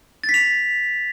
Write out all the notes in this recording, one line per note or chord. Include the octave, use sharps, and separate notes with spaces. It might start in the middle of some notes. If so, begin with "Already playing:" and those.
A6
B6
F7